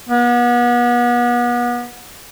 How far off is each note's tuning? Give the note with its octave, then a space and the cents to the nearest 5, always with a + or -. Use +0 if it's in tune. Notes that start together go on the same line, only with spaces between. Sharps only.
B3 -35